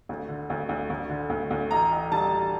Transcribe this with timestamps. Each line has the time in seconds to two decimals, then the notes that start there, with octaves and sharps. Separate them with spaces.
0.09 D2
0.29 D3
0.50 D2
0.69 D2
0.90 D2
1.10 D3
1.30 D2
1.51 D2
1.71 A1 A#5
1.91 A1
2.12 G3 A5
2.32 A1